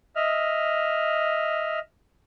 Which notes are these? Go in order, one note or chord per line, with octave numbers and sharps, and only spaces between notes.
D#5 E5 F6